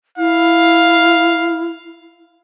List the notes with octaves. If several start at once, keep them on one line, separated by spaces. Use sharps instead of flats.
E4 F5